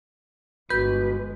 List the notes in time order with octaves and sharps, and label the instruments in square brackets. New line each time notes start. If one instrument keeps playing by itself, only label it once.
[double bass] G1 G#3 [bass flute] F#4 [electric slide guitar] B4 [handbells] G6